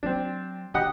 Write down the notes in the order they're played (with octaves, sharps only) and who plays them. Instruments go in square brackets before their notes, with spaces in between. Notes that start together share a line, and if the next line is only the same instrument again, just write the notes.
[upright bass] F#3 [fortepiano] C4 D4
[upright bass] D3 [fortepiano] G4 D#5 F#5